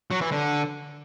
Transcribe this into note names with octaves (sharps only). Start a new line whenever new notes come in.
F#3
E3
D3